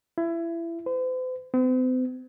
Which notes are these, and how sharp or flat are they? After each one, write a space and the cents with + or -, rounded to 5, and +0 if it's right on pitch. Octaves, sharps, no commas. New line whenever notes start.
E4 +25
C5 -45
C4 -45